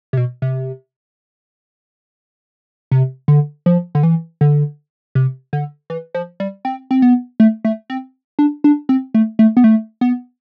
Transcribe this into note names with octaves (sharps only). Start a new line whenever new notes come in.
C3
B2
C3
C3
D3
F3
D3
E3
D3
C3
D3
E3
F3
G3
C4
C4
B3
A3
A3
C4
D4
D4
C4
A3
A3
B3
A3
B3